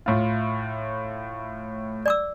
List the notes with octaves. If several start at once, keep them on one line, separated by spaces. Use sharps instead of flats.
A2 F4
D5 D6 E6